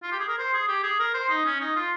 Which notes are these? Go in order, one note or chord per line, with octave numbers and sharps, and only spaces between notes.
F4
G4
G#4
A#4
C5
G#4
G4
G#4
A#4
C5
D#4
C#4
D#4
F4